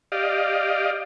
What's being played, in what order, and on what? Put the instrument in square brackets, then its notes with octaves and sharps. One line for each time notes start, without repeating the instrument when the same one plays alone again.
[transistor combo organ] G4 D5 D#5 F5